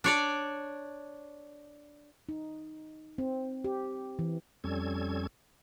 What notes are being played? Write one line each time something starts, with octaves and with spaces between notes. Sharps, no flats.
D4 C#5 D5
D#4
C4
G4
E3
F2 G3 C#4 A4 G#6